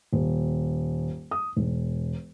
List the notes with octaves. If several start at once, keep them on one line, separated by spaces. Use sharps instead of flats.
D#1
D#6
E1